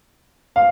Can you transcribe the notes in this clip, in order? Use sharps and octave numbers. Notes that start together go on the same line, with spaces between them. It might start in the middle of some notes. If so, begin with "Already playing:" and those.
F5